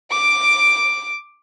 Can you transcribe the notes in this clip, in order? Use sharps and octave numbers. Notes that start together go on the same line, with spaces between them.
D6 D7